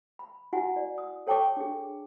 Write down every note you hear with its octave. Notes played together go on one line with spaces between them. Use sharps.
B5
E4 F#4 F#5 G#5
D5
D#6
A4 C#5 G5 A5 C#6 D6
D4 G#4